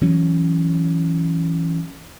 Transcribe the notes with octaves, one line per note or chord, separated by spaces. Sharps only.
E3 F#3 C#4